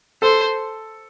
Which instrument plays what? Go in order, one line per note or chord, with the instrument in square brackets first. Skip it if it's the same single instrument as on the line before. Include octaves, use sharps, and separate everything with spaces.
[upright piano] A4 [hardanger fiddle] C5